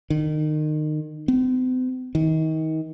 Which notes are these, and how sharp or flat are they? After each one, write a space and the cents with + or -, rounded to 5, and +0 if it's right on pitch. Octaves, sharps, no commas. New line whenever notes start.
D#3 -30
C4 -45
D#3 +30